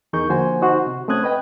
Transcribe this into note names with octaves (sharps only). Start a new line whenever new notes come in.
E2 D#4 G#4 A#4 C#6 G6
D3 F3 A#3 F#4 C5 G#5
D#4 F#4 C5
C3
A3 C4 C#4 D#6 F#6 G#6
B4 D#5 G5